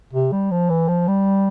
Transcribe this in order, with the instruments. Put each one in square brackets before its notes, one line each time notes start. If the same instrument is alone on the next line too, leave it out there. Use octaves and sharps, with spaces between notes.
[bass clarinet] C3
G3
F3
E3
F3
G3